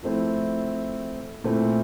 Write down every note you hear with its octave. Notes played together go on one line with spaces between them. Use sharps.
F3 A3 C4 E4
A#2 A3 C4 E4